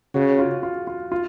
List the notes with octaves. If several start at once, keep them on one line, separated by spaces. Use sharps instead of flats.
C#3 F#4
F4
F4
F4
F4